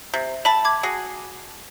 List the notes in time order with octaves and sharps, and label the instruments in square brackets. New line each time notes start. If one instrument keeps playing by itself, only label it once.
[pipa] C3
[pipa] E5 A5 [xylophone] B5
[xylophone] D6 G#6
[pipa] F#4 G#4